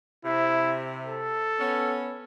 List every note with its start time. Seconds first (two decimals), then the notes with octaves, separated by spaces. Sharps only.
0.25 C3 E4
1.06 A4
1.60 B3 C#4